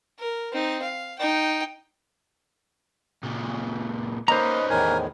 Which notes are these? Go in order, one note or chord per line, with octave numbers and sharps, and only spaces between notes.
A#4
C4 D#4
F5
D#4 G5
A#2 C#3
A#3 C#4 D#4 B4 C5 D#5 A#5
E2 A2 D#3 A#4 G#5